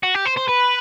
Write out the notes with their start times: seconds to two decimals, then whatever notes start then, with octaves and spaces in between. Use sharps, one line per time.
0.03 F#4
0.15 G4
0.26 C5
0.37 C5
0.49 B4